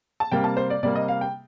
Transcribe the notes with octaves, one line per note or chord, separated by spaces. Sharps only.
A5
C3 G3 A#3 G5
A5
C5
D5
C3 G3 A#3 D5
D#5
F5
G5